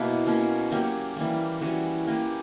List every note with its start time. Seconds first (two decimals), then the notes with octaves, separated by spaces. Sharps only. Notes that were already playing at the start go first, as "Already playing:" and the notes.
Already playing: B2 A#3 E4 B4
0.27 B2 A#3 C#4
0.71 F#3 A#3 C#4 G4
1.16 E3 G3 A#3
1.61 E3 G3 C#4 F#4
2.07 A#3 C#4 G4 B4